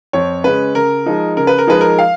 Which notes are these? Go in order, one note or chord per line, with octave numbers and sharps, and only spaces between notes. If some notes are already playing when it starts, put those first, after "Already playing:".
F2 C#5
C#3 G#3 C#4 B4
C#3 A#4
F3 G#3 D#4
C#3 A#4
B4
A#4
F3 G#3 D#4 B4
A#4
F5